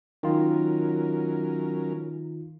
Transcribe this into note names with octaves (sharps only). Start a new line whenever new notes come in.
D#3 F#3 C#4 F4 A#4